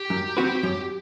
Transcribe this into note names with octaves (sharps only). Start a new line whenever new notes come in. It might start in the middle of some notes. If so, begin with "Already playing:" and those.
Already playing: G4
F#2
F#3 C4 F#4 B4
F#2